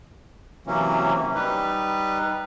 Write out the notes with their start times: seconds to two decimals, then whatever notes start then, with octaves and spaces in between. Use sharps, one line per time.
0.67 C3 E3 F#3 A#3 C#4
1.35 G3 D#4 B4